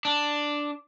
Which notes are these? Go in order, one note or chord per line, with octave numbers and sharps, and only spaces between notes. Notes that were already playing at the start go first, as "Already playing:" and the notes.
D4